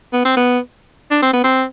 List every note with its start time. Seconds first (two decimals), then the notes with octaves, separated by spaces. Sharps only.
0.13 B3
0.25 C4
0.36 B3
1.11 D4
1.22 C4
1.33 B3
1.44 C4